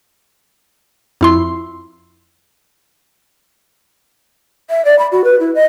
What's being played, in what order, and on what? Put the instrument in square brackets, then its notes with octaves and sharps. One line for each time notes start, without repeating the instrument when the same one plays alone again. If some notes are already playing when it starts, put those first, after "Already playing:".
[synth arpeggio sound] F2 E4 C6
[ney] E5
D5
B5
F#4
B4
E4
D#5